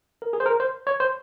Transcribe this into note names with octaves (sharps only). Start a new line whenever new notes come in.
A#4
G#4
C5
A#4
C5
C#5
C5